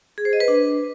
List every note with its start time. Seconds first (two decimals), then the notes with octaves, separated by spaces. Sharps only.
0.18 G#4
0.25 C5
0.33 D#5
0.40 B4
0.48 D4